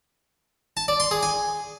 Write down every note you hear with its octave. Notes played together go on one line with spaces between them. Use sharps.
A5
D5
C6
G#4
G#5